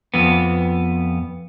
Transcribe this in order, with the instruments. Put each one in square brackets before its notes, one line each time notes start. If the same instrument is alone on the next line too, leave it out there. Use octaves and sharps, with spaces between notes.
[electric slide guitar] F2 B3